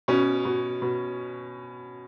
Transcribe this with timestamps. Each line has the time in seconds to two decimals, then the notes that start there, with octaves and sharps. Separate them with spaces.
0.08 B2 C#4
0.45 B2
0.82 B2